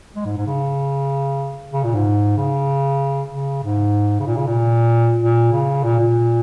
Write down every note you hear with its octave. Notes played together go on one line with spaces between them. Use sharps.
G#3
G#2
G#2
C#3
C#3
A#2
G#2
C#3
C#3
G#2
C#3
A#2
C#3
A#2
A#2
C#3
A#2
A#2